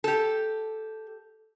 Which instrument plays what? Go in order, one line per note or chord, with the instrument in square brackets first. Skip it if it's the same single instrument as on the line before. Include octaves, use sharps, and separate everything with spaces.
[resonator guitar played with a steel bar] G4 A4